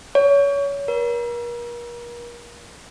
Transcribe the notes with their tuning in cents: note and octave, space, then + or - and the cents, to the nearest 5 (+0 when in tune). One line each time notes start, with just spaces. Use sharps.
C#5 +25
A#4 +40